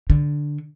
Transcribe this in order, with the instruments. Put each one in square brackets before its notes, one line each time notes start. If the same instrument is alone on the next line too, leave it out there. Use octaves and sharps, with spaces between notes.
[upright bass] D3